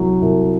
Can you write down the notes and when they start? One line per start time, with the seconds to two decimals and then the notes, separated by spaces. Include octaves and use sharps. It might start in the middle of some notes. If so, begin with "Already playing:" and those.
Already playing: C2 F#3
0.22 C2